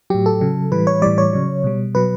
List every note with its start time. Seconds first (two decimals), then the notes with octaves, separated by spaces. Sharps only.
0.10 A2 F#3 G4
0.26 A4
0.41 C#3 F#3
0.71 A2 E3 G3 B4
0.87 C#5
1.02 A2 E3 G3 D5
1.18 C#5
1.33 C#3 F#3
1.64 B2 G3
1.95 B2 F#3 B4